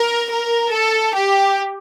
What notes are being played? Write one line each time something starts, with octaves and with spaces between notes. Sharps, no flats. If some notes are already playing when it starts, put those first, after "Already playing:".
Already playing: A#4
A#4
A4
G4